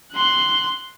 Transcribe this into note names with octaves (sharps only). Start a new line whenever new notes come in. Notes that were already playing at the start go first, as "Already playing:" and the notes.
C6 F#6